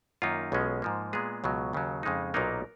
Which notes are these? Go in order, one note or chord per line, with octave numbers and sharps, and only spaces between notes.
F#2 D#3 A#3 D#4 F4
B1 B2 G#3 C#4
G#2 F3 A#3
A#2 G#3 B3 G#4
C#2 B2 F#3
D#2 C#3 F#3
F2 C#3 G#3 D#4
B1 A#2 F#3 A#3 B3 D#4 A#4